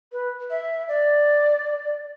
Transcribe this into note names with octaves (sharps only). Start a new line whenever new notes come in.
B4
E5
D5